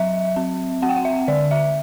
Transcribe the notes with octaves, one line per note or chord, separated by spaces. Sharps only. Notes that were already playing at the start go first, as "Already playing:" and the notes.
Already playing: F#3 E5
C4
C4 F#5
G5
F#5
E5
D3 D5
E5